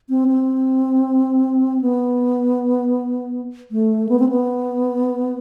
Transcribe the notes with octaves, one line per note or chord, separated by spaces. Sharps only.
C4
C4
B3
A3
B3
C4
B3